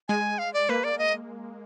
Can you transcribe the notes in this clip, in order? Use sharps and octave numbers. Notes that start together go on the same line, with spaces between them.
G#3 G#5
F5
D5
A#3 B4
D5
D#5